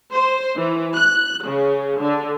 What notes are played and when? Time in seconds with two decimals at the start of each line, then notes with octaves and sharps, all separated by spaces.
0.14 C5
0.57 E3
0.96 F#6
1.46 C#3
2.00 D3